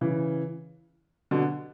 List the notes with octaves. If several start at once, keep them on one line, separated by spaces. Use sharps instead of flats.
C#3 E3
B2 D3